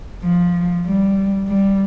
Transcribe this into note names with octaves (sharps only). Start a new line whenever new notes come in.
F3
G3
G3